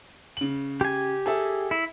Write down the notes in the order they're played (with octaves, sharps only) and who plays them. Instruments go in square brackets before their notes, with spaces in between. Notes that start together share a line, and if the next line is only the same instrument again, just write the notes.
[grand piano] C#3 F#7
[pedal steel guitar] G4 G#5
[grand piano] G#4 A4 E5
[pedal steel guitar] E4